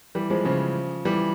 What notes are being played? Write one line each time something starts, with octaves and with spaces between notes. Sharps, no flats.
E3 G3
F3 G#3
C#3 F3
E3 G3